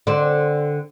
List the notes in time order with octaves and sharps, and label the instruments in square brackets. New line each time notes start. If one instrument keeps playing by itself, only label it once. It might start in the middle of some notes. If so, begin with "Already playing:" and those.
[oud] D3 C4